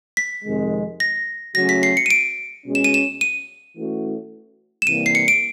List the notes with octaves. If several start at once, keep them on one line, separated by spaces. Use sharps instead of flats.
B6
F2 C3 D#3 G#3
A#6
C#3 F#3 A3 C#4 F#4 A#6
B6
C7
C#7
D#7
D7
B2 G#3 C#4
E7
D#7
E7
D#7
E3 A3 C#4 F#4
E7
C3 E3 G3 A#3 D#7
C7
C#7
D7